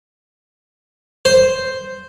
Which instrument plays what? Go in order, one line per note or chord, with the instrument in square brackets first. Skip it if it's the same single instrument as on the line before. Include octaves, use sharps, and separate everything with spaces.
[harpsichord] C5